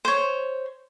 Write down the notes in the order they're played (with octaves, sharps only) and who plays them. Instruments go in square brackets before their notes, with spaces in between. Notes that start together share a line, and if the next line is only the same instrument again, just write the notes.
[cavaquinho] C5 C#5